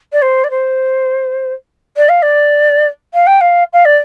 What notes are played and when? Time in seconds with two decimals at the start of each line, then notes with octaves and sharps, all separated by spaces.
0.13 D5
0.22 C5
0.44 D5
0.50 C5
1.97 D5
2.09 F5
2.22 D5
3.14 F5
3.27 G5
3.41 F5
3.73 F5
3.85 D5